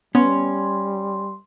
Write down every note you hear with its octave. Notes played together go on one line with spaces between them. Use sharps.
G3 B3 C#4 C6